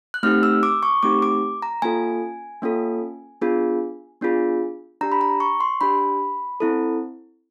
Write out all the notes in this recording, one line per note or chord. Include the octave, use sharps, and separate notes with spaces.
F#6
A3 C4 D#4 G4 F6
E6
D6
C#6
A3 C4 D#4 G4 D6
D6
A#5
A#3 C#4 F4 A4 G#5
A#3 C#4 F4 A4
B3 D4 F4 G#4
B3 D4 F4 G#4
D4 G4 A#5
B5
A#5
C#6
C6
D4 G4 B5
C4 E4 A4